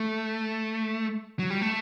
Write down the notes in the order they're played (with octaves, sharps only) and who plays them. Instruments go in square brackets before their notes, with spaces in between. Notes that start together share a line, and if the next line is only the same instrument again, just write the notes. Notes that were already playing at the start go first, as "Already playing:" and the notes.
Already playing: [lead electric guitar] A3
F#3
G3
A3